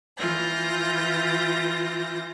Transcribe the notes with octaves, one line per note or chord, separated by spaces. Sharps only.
E3 F4 G6 A#6